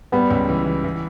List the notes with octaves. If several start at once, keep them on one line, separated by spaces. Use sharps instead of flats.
G3 B3
C#2
E3
E3
E3